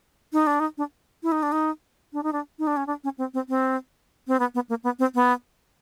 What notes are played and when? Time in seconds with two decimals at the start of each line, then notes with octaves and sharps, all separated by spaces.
0.33 D#4
0.47 D4
0.60 D#4
0.78 D4
1.23 E4
1.32 D#4
1.43 D4
1.52 D#4
2.13 D4
2.23 D#4
2.33 D4
2.59 D#4
2.67 D4
2.77 C#4
2.87 D4
3.04 C#4
3.18 C4
3.34 C4
3.49 C4
4.27 C4
4.39 B3
4.55 B3
4.69 A#3
4.84 B3
4.99 C4
5.15 B3